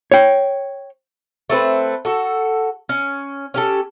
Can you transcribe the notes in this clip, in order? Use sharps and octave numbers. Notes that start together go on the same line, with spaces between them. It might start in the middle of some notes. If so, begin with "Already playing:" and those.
C#5 G5
A3 C4 A4 B4
F#4 A4
C#4
C#4 G4 A4